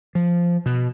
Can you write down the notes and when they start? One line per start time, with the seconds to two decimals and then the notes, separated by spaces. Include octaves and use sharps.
0.15 F3
0.66 B2